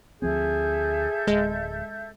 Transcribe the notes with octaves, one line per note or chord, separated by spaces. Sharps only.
D2 F3 C4 G#4 A4 E5 G6
D1 G#3